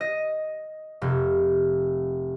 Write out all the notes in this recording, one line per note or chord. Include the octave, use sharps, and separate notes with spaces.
D#5
F1